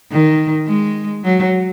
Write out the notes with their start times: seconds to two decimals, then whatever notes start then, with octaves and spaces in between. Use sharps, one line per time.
0.12 D#3
0.67 G#3
1.24 F#3